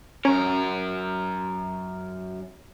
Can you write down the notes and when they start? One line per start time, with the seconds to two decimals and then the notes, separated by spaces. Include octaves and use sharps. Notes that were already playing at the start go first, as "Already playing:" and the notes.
0.25 F#2 C#4 A#4